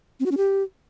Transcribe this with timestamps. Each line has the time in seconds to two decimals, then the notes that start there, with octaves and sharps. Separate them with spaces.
0.20 C4
0.26 F#4
0.31 C#4
0.37 G4